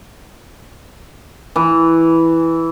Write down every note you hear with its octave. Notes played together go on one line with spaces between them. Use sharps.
E3